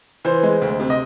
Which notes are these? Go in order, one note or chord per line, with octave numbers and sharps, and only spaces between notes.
E3 C5
G#3
D2
C3
D#5